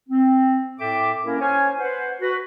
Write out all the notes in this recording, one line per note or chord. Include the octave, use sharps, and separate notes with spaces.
C4
A2 A4 E5 G5 D6
A#3 C#4 E4 A#4
C#4 C5 C#5 G#5
B4 C5 F#5
F#4 B4